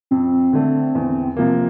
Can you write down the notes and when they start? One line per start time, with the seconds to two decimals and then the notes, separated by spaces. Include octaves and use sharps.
0.11 F2 C4
0.53 D3 A3
0.95 E2
1.37 C3 F3 A#3